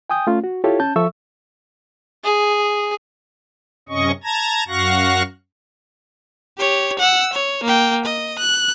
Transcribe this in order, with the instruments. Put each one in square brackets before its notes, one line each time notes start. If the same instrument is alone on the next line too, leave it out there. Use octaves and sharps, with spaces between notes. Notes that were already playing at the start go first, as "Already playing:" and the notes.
[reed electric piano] G5 G#5 D#6 G6
A3 C#4 F4
F#4
E4 F4 G4 A4 C#5
C#4 A5 G6
F3 A4 E5 C#6 E6
[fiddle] G#4
[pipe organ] F#2 C3 C#4 D#5 C#6
A5 A#5 G#6 A#6
F#2 F#4 F5 C#6 F#6 A#6
[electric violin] G4 C#5
F#5 E6
C#5
A#3 G5
D#5
F#6